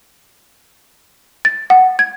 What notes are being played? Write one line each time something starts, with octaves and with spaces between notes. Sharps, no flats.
A6
F#5
G#6